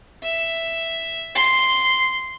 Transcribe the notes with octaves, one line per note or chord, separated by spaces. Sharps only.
E5
C6